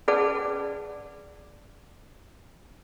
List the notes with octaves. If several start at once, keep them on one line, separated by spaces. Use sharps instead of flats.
C#4 G#4 B4 D5 F#5 A5